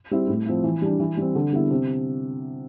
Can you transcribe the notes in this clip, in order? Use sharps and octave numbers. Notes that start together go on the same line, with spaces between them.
G3 C4 E4
A2
F3 C4 E4
E3
G3 D4
E3
G3 C4
D3
G3 B3 E4
C3